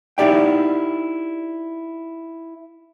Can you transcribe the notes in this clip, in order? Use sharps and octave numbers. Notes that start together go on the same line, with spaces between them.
D#4 E4 G4 D5 G5